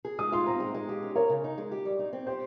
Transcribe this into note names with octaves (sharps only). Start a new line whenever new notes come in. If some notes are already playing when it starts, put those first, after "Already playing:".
G#4
G#3 D#6
F4 C6
C4 A#5
G#3
G#3
G4
C#4
A#4 C#5
C#3
D#4
G#3
G4
G3
D#4
C4
G4 C5